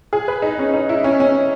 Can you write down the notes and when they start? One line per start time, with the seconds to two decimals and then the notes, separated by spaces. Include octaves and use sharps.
0.13 G#4
0.28 B4
0.42 D#4
0.59 C#4
0.74 D#4
0.89 E4
1.04 C#4
1.20 C#4